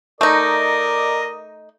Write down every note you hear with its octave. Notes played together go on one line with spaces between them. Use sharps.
A3 D#4 A#4 D5 D#5